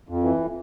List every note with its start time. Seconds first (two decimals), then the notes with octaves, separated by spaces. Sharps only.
0.09 F2
0.24 E3